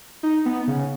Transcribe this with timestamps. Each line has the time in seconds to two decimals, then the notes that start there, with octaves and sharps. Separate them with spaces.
0.23 D#4
0.46 B3
0.68 C#3